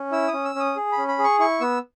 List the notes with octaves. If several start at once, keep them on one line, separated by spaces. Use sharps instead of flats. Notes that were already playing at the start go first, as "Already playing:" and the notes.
Already playing: C#4
E4 E6
D#6
C#4
E6
C#4 D#6
G#4
B5
C#4
B5
G#4
C#6
E4 C#6
B3 E6